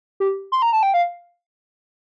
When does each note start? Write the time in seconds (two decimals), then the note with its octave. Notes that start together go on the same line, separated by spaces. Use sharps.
0.20 G4
0.52 C6
0.62 A#5
0.73 A5
0.83 G5
0.94 F5